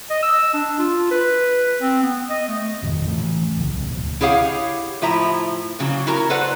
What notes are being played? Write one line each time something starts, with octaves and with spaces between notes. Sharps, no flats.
D#5
E6
D4
F4
B4
C4
B3
D#5
A3
F2 A#2 D#3
E3 A3
F1 C2 C#3 F#3
D1 D2 B2
E4 G4 G#4 C#5 F5 F#5
A2 F3 E4 E5 A#5
A#2 C#3 F#3
E4 F#4 A#4 A#5
A4 B4 C5 D5 F#5